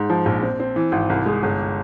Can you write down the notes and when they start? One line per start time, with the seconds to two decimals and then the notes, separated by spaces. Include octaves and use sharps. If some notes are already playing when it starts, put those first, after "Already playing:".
Already playing: G#2
0.10 F3
0.26 A#1
0.43 C4
0.60 C4
0.76 E3
0.92 G#1
1.10 C2
1.26 G#3
1.43 G1